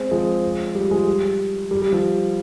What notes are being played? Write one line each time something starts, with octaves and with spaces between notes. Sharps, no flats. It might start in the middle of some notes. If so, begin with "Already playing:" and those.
Already playing: G#3 C4
F3 G#3
G3
F3 G#3
G3
G3
G3
F3